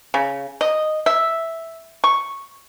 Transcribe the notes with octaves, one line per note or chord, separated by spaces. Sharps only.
C#3
D#5
E5
C#6